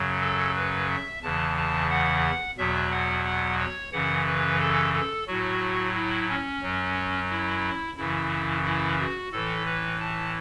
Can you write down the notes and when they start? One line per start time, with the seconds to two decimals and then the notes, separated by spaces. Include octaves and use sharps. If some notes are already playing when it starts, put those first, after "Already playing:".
Already playing: F#2 C#3 F#3
0.21 A4
0.56 B4
0.89 E5
1.23 E2 C#3 E3 A5
1.57 A5
1.90 F#5
2.58 E2 B2 F#3 E5
2.92 F#5
3.25 F#5
3.59 C#5
3.92 F#2 C#3 E3 F#5
4.27 B4
4.60 A4
4.94 A4
5.27 A2 F#3 F#4
5.95 E4
6.29 C#4
6.62 F#2 F#3
7.30 E4
7.97 F#2 C#3 E3 E4
8.65 E4
8.99 F#4
9.32 A2 E3 A4
9.66 B4
10.00 A5